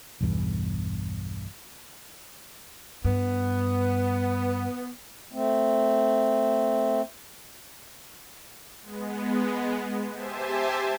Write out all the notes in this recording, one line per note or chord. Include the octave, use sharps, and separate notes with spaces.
B1 E2 G2
G2 B3
A3 C4
G#3 B3
G4 C5 E5 G#5 A5